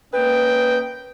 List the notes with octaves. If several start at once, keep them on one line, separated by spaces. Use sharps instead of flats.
A#3 C#4 B4 D#5 G5